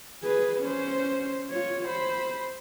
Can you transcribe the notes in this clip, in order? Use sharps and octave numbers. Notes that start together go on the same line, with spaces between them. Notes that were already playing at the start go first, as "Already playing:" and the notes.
G#4 B4
C#4 C5
F4 C#5
C5 B5